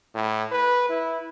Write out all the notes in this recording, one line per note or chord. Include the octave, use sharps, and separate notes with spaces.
A2
B4
E4